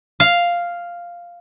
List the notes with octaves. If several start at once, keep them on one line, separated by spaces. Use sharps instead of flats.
F5